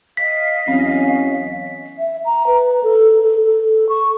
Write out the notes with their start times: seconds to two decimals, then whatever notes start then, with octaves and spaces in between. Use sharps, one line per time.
0.17 D#5 F5 B6
0.68 E2 F#3 C4 C#4
1.99 E5
2.25 A#5
2.47 B4
2.83 A4
3.22 A4
3.45 A4
3.89 C#6